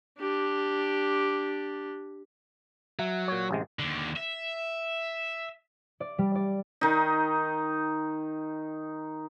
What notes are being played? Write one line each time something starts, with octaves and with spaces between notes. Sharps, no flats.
D4 G4
F#3 E5
A#2 C#5
A1 C3 G#3
D#2 D3
E5
D5
G3
D5
D#3 D#4